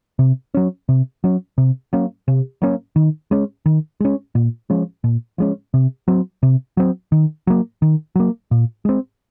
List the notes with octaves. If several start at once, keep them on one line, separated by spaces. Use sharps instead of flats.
C3
F#3 C#4
C3
F#3 C#4
C3
F#3 A#3 C#4
C3
F#3 A#3 C#4
D#3
G#3 C#4
D#3
G#3 C#4
A#2
F3 G#3 C#4
A#2
F3 G#3 C#4
C3
F#3 C4
C3
F#3 C4
D#3
F#3 A#3
D#3
F#3 A#3
A#2
G#3 C4